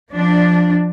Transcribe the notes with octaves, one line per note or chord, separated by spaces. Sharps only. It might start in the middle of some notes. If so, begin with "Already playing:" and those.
F3 D4